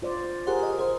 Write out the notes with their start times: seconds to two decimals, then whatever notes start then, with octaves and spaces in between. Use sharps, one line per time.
0.02 F4 C5 D5
0.47 G4 G#4 A#4 C5 F#5
0.63 D#5
0.79 G#4 C5